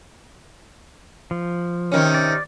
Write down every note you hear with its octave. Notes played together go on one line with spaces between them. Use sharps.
F3
C3 D#3 C#4
D5